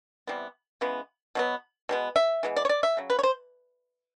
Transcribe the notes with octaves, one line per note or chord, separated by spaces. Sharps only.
C3 E3 G3 B3
C#3 E3 G#3 B3
B2 F#3 B3
B2 G#3 B3
E5
E3 G#3 B3
D5
C#5
D5
E5
C#3 F#3
B4
C#5
C5